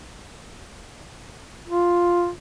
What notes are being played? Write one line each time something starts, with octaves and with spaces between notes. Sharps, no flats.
F4